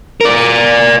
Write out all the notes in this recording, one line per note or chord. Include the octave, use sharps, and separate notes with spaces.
A#4 D5